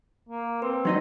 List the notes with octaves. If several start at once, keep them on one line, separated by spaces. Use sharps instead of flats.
A#3
C4 B4
F#3 D4 D#4 D5 D#5